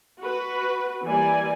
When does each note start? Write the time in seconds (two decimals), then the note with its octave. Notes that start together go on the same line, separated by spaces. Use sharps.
0.20 F#4 B4
1.05 E3 G3 A#3 D5 G#5